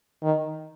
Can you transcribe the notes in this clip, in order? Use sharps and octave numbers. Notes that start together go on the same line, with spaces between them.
D#3